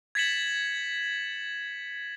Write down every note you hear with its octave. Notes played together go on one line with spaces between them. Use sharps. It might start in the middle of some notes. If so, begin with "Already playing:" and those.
G#6 A6 B6 C#7 E7 F#7